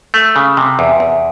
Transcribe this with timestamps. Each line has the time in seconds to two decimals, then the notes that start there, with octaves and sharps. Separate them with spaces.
0.14 A3
0.36 C#3
0.57 C3
0.79 E2
1.00 E2